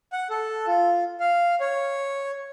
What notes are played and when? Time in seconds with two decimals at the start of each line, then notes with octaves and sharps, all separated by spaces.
0.13 F#5
0.30 A4
0.67 F4
1.20 F5
1.61 C#5